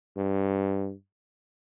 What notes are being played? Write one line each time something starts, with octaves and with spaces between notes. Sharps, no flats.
G2